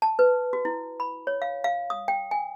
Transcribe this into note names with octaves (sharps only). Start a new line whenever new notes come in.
A5
B4
F#4
E4
B5
C#5
F5
F5
D#6
G5
G#5